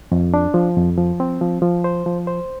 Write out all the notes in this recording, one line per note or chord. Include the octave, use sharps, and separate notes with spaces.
F2
D4
F3
F2
F3
C4
F3
F3
C5
F3
C5